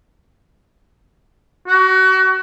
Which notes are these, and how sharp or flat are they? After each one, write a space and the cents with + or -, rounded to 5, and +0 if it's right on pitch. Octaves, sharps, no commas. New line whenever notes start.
F#4 +30